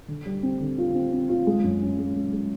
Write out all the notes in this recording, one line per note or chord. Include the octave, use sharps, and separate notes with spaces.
D3
G3
C4
D3
F4
C4
C4
F4
G#3
F#2
C#4
G#3
G#3
G#3